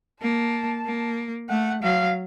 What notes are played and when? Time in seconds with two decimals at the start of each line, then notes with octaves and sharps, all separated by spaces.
0.21 A#3 A5
0.86 A#3
1.49 A3 F#5
1.82 F#3 F5